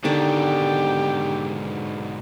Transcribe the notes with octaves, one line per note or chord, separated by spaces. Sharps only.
G#2 B2 D3 D#3 G4 G5 A5